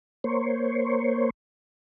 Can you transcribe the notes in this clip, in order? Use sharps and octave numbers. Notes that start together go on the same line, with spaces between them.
A#3 C5 C#5